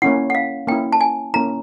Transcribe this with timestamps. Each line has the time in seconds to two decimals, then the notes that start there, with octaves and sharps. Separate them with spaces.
0.02 A#3 C#4 E4 F#5
0.30 F#5
0.35 F5
0.67 A#3 C#4 E4 G5
0.92 A5
1.01 G#5
1.34 A#3 C#4 E4 A#5